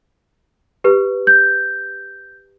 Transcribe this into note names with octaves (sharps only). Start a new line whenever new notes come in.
G4 B4
G6